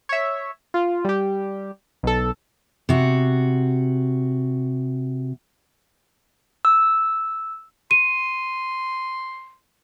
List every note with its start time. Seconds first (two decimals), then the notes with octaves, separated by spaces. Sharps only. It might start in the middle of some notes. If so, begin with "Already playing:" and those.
0.09 C#5 E5
0.74 F4
1.05 G3 G4
2.03 B1 A4
2.89 C3 F#4
6.65 E6
7.91 C6 D#7